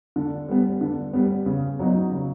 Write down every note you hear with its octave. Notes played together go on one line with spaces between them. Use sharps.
D3
G3 B3
D3
G3 B3
C#3
F#3 B3 D#4
C#3